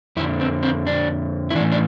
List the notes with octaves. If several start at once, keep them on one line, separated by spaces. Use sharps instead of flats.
F2 D3 E4
C4
C4
D4
E4
A2 E3 D4
D4